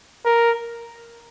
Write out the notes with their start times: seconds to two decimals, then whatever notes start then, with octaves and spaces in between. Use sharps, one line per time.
0.25 A#4